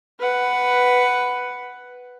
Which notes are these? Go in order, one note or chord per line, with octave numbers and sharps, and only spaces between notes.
B4 F#5